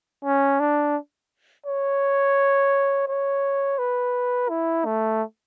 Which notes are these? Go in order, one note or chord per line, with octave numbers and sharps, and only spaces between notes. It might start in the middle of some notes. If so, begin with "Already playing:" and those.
C#4
D4
C#5
C#5
B4
E4
A3